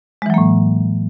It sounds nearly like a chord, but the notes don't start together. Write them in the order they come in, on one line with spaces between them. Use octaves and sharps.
G#3 E3 F#3 A#3 A2